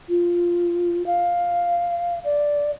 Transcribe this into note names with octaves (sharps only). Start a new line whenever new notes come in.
F4
F5
D5